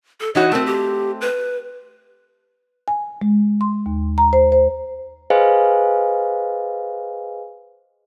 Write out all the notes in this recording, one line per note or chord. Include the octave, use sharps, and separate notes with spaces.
A4
E3 D#4 F#4 C#5
A3 C4 A#4
G4
B4
G#5
G#3
C6
D#2
A#5
C5
C5
G#4 B4 C5 D#5 F5 G#5